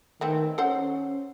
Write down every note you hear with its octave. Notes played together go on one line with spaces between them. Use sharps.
D#3 E3 A3 C4
C#4 A4 C5 F#5